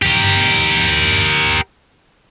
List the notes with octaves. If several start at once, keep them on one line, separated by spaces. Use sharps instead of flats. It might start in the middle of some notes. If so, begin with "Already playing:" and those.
G4 A#4